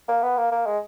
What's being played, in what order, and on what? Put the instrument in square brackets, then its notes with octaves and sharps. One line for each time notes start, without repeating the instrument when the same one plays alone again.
[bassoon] A#3
B3
A#3
A#3
G#3